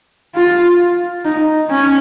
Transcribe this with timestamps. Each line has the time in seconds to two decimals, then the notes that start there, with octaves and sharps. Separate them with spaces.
0.36 F4
1.25 D#4
1.70 C#4